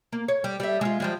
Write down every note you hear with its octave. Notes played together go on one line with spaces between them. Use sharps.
A#3
C#5
G3
G3 E5
G#3 F4
F3 G3 G#3